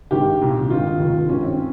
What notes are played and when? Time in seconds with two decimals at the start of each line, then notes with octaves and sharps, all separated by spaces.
0.11 G#1 G2 D#3 G4
0.41 C2 A#2
0.70 G#1 G2 D#3 F4
1.00 F1 D#2 D#3
1.29 G#1 G2 D#3 C#4
1.43 C4
1.57 C#4